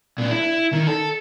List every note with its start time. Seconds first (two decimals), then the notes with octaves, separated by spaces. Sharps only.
0.18 A#2 D4
0.31 E4
0.73 D#3
0.87 A4